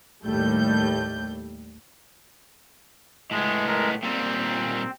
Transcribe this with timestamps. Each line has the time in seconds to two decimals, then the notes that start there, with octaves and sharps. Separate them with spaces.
0.24 D#2 A2 G3 A3 G6
3.31 A2 G#3 B3
3.67 G#3 A#4
4.03 A#2 G3 C4